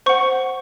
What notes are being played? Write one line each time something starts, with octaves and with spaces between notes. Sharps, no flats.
C5 F#5 C#6